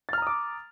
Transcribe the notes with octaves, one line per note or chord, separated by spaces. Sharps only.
A#5 D6 D#6 F6 A6